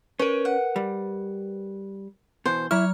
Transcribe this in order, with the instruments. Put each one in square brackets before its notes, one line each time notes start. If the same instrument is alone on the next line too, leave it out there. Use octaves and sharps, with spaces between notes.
[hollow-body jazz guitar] C#4 [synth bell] A#4 B4 [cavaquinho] C#5
[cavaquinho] F#5
[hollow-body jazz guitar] G3
[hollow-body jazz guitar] B2 E3 [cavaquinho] C5
[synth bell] F#3 F6 [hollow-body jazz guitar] E4 [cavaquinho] C#5